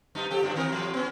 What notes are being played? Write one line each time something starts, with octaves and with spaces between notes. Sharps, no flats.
F#2 D#4
F3 G4 A4
F#2 A2 D4
D#3 C4 A#4
A2 E3 F#3
B3 C#4